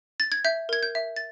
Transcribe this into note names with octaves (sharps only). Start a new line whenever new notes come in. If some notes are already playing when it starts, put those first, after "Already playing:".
A6
G#6
E5 G6
A#4 G#6
G6
E5
A6